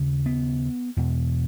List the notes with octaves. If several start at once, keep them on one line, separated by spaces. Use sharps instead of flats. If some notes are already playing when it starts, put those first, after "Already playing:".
Already playing: D#2 C#3
B3
E2 B2